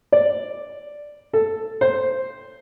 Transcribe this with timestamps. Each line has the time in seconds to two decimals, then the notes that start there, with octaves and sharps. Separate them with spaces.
0.12 D5
1.33 A4
1.81 C5